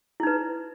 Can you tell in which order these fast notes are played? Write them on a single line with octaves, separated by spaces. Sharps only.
E4 D#4 B4